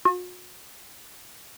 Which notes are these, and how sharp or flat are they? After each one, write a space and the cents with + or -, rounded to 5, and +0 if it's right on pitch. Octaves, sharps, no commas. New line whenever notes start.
F#4 -45